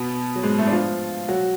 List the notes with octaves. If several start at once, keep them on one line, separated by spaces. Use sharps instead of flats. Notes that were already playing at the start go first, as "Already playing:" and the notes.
Already playing: B2 B3
F#3
G#2 G#3
A2 A3
D4
F3 F4
F#3 F#4